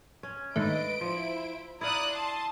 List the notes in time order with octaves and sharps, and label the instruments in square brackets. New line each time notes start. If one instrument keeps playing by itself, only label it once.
[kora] C#4
[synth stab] G#2 D#3 A3 [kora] D4 [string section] B4 D#5 [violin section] D7
[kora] F3 [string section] E4 C5
[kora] E4 F5 [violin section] D5 D#6 F#6 [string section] A#5
[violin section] A5 [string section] C6 D#6